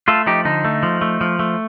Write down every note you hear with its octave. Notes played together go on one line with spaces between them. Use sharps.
A3 F4 A4
F3 D#4 G4
D3 D#4
A3
F3
A3
F3
A3